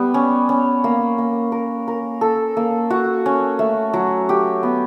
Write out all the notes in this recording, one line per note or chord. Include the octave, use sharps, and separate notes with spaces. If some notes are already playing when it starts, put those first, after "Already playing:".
Already playing: G3 B3
C#4
C#4
A#3
A#3
A#4
A#4
A4
A#3
F#4
C#4
A3
F#3
G4
B3